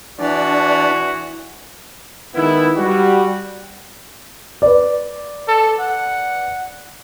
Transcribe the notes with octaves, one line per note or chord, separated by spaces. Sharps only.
E3 D4 F#4 D5
D#3 G#3 B3 E4
G3 F#4
B4 D5
A4
F#5